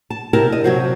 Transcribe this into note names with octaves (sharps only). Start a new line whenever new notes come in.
A5
C3 E4 G4 A#4 A5
D#5
C3 F#3 E4 F#4 C5 F5